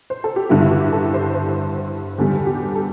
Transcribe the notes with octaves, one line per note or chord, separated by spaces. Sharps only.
C5
A4
G4
G2 D3 G3 E4
E4
G4
A4
C5
C5
E2 D3 G3 A4
G4
A4